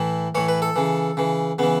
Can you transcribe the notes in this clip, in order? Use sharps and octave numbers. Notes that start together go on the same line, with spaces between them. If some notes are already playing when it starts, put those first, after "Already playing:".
Already playing: A2 E3
A2 E3 C#5
B4
A4
C#3 E3
C#3 E3
C#3 E3 B3